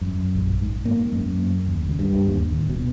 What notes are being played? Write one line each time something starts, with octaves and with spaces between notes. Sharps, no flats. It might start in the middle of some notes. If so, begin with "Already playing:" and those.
F#2
A#1
G#2
A#3
F#2
D#2
C#2
G2
D#2
D1
B2